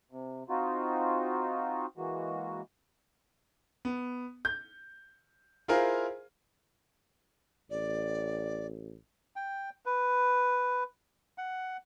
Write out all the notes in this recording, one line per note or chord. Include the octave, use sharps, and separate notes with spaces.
C3
C4 D#4 F4 F#4
E3 G#3 A#3 F#4
B3
G6
E4 F4 G#4 A#4 C5 F5
A1 D5
G5
B4
F#5